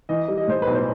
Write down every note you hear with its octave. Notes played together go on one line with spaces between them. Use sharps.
E3 D#5
G3
D#5
A2 C5
B1 B4
C5